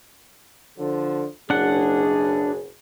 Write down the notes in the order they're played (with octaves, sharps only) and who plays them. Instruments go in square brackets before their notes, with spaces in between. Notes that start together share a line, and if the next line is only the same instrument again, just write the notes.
[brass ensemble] D3 F3
[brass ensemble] F#1 B2 G#4 [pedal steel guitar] D4 F#5